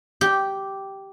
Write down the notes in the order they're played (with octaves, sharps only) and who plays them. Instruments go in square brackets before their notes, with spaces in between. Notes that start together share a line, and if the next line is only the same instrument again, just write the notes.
[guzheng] G4